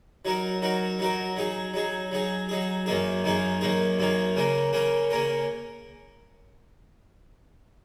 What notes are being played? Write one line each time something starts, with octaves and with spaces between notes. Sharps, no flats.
F#3 D#4 F#4 A#4
F#3 D#4 F#4 A#4
F#3 D#4 F#4 A#4
F#3 D#4 G#4
F#3 D#4 G#4
F#3 D#4 G#4
F#3 D#4 G#4
F#2 D#3 A#3 D#4 G#4
F#2 D#3 A#3 D#4 G#4
F#2 D#3 A#3 D#4 G#4
F#2 D#3 A#3 D#4 G#4
C#3 A#3 C#4 A#4
C#3 A#3 C#4 A#4
C#3 A#3 C#4 A#4